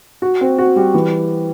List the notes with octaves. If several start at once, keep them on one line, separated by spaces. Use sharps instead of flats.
F#4
C4
F#4
G3
E3